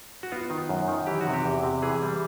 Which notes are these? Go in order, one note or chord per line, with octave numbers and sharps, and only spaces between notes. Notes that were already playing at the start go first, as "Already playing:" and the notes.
F#4
B3 F4
D#3
F#2
D#3
E3 G4
F#4
C3
G4
E2
C3
E3 G#4
G3